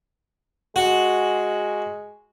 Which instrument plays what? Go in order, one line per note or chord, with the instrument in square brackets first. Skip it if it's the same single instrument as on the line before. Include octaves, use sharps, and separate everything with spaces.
[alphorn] G#3 [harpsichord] F#4